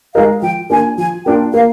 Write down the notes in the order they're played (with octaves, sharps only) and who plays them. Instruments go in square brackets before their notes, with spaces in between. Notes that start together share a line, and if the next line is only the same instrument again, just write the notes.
[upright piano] G#3 D#4 A#4 D#5 [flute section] F5
[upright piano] F3 [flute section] G5
[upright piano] A#3 D4 F4 [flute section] G#5
[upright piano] F3 [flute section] G#5
[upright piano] A#3 D4 F4 [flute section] G5
[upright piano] A#3 [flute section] F5